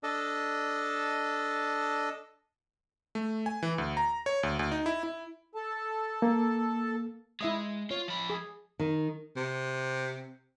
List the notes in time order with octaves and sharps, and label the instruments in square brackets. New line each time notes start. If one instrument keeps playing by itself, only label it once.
[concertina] D4 A4 D#5
[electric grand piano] A3
G#5
E3
D2
A#5
C#5
D2
D2
D#4
E4
E4
[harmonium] A4 A5
[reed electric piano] A#3
[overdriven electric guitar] G#3 [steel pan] E4 E5 D#6
[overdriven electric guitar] F4 [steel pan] C#5
[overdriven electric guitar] F3 B5
[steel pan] G#4
[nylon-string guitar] D#3
[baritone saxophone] C3